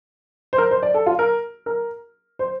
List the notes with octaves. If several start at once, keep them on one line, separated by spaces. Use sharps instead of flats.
C5
A#4
C5
D5
A4
F4
A#4
A#4
C5